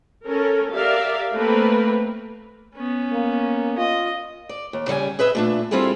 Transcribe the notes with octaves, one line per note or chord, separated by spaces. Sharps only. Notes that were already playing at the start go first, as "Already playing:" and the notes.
C#4 A4 A#4
G4 A#4 D5 E5 F5
A3 A#3 C4 A#4 B4
B3 C#4
A#3
F4 D#5
D5
D#2
C#3 G3 E5 G#5
G#4 B4 D#5 E5
A#2 A3 D4
G3 C4 E4 F4 G#4 A4